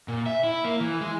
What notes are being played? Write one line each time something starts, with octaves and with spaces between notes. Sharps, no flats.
A#2
E5
E4
A#3
E3
G#3